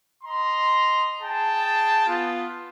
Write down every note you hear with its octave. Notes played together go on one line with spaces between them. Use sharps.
D#5 A#5 C6
G#4 G5 A5
B3 F4